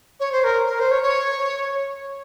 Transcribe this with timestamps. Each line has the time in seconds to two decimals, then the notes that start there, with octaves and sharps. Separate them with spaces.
0.20 C#5
0.32 C5
0.44 A#4
0.67 A#4
0.79 C5
0.91 C#5
1.03 C#5